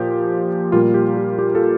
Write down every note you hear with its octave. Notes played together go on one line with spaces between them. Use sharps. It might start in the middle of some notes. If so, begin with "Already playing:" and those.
Already playing: A#2 F3 A#3 G4
A#2 G3 A#3 F4
G4
G4
G4
F4 A4